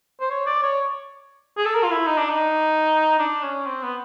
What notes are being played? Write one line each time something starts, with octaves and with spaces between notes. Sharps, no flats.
C5
C#5
D5
C#5
G#4
A4
A#4
F4
E4
D#4
D4
D#4
D4
C#4
C4
B3